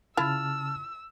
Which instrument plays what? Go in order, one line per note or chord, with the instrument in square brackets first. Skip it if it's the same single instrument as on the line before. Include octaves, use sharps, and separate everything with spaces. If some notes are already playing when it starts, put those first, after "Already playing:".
[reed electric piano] C#3 A5 F6 [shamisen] E4 F4 [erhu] E6